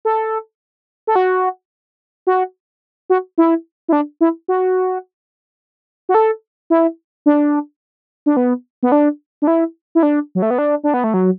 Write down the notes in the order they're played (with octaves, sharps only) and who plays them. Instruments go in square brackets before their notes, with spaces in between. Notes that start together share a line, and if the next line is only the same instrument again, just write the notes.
[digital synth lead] A4
A4
F#4
F#4
F#4
E4
E4
D4
E4
F#4
F#4
A4
E4
D4
D4
B3
B3
D4
D4
E4
E4
D4
F#3
A3
B3
D4
D4
B3
A3
F#3